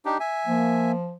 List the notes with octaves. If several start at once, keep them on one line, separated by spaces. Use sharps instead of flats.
D4 D#4 G4
E5 G#5
F3 A#3